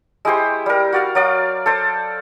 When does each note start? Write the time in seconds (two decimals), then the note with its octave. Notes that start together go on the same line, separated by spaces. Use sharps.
0.25 G#3 E4 G4 C5
0.66 G3 A#4
0.93 F#4 D5 F5
1.15 F#3 D5 F5
1.66 A4 C5 D5